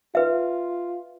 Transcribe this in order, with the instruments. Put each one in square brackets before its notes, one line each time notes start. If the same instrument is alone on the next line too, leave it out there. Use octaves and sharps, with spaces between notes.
[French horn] F4 [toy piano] B4 E5